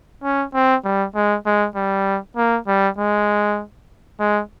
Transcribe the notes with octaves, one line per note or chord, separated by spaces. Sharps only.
C#4
C4
G3
G#3
G#3
G3
A#3
G3
G#3
G#3